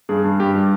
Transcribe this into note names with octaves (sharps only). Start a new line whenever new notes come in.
G2 G#4
G2
G2 G4
G3